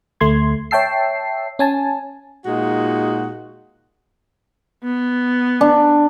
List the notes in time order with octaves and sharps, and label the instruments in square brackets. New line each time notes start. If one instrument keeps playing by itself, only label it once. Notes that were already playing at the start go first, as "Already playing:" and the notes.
[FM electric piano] D2 A3 C6 G#6
C#5 E5 G5 A5 E6 C7
C#4 G#5 A5
[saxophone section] A#2 G#3 D#4 F#4
[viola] B3
[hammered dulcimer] D4